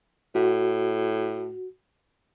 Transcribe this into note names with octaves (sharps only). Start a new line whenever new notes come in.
A2 F#4